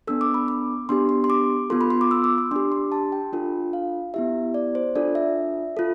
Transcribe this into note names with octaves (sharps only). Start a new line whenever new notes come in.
B3 D4 A4 E6
D6
B5
D6
B3 D4 G4 C6
C6
C6
D6
B3 F4 A4 C6
B5
C6
D6
E6
D6
D6
D4 G4 C6
C6
A5
G5
D4 F4 A4
F5
B3 E4 G4 E5
D5
C5
D4 F4 A4 D5
E5
F4 A4